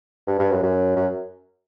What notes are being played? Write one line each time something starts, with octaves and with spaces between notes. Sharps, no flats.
G2
G2
F#2
F#2
F#2